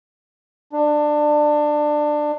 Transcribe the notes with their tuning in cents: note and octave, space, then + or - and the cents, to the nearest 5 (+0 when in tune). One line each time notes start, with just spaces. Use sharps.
D4 +20